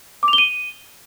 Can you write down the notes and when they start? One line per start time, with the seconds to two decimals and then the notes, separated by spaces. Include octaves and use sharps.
0.23 D6
0.28 F7
0.33 G7
0.38 D#7